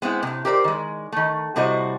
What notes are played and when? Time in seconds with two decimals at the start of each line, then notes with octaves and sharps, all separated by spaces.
0.02 G#3 B3 C4 E4
0.23 A2 C3
0.45 G4 A#4 C5 D5
0.64 D#3 G#3
1.12 D#3 A3
1.56 A2 C3 G3 F#4 C5 D#5